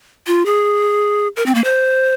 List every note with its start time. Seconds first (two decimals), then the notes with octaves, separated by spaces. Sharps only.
0.27 F4
0.46 G#4
1.36 A#4
1.46 C4
1.55 A#3
1.64 C5